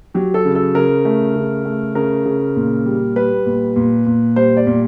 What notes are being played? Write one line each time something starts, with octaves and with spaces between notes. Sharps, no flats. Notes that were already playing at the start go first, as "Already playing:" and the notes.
F#3 G4
A4
C#3
A4
C#3 A#4
A3
C#3
A3
C#3 A#4
C#3
A#2
G3
G3 B4
A#2
A#2
A#2
G3 C5
D5
A#2